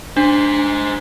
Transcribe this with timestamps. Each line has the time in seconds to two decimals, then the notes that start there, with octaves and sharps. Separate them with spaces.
0.17 D4 G#4 C5